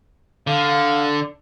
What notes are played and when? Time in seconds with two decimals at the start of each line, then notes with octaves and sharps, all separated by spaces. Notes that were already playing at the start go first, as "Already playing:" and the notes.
0.47 D3 F5